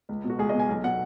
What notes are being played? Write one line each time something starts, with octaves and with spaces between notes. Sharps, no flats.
C#2
B2
F#4
C#2 G#4
D#5
B2
G#5
B1
B2 F#5